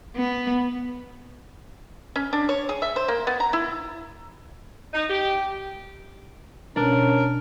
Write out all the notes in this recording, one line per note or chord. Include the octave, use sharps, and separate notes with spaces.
B3
C#4
D4
C#5
G#4
E5
C5
A#3
B3
A#5
E4
D#4
G4
B2 C#4 D4 A#4